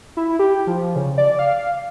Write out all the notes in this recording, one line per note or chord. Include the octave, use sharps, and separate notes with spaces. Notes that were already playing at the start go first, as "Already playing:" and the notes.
E4
G4
F3
C#3
D5
F5